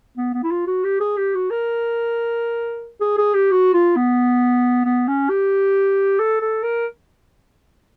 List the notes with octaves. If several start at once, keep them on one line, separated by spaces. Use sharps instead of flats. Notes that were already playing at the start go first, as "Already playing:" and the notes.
B3
B3
E4
F4
F#4
G4
G#4
G4
F#4
A#4
G#4
G#4
G4
F#4
F4
B3
B3
C#4
G4
A4
A4
A#4